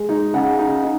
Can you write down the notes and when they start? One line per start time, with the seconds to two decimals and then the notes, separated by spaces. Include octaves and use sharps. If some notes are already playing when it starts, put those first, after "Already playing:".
Already playing: G#3
0.09 D#4
0.34 C#3 F#5
0.59 D#4
0.84 D#4